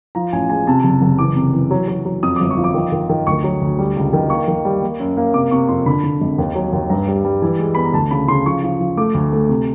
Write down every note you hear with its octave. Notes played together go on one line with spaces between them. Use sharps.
F3 A#5
A1 G#5
G#3 G#5
C3 A5
F#1
F#1
E3 D6
C3
E3
F#3
F#3
F#3
F2 D#6
G1 D6
C#6
F3
D6
D#3
D#3
D#3
D2 C#6
F#3
D2
G3
C#2
D#3
A#3 C#6
D#3
G3
A#3
F#2
A#3
C3 D6
C3 C#6
F2 C6
D3 B5
D3
G#1
D#2
F#3
D#2
G2 A#5
G3
G3
E3
G#3
B3 B5
A#5
D2 A5
C#3 B5
C#3 C6
F3 C#6
F3
F3
A3 D6
D2
A3
C3